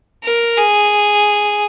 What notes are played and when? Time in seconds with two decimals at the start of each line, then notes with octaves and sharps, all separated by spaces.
0.24 A#4
0.57 G#4